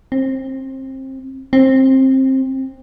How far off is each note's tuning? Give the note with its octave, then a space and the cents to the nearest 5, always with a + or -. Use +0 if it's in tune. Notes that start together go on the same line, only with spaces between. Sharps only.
C4 +25
C4 +20